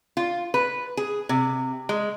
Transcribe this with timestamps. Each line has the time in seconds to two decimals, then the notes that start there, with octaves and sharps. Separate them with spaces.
0.17 F4
0.54 B4
0.97 G#4
1.29 C3
1.89 G#3